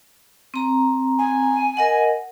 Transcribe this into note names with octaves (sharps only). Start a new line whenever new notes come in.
C4 A#5
G#5
A#4 D#5 F#5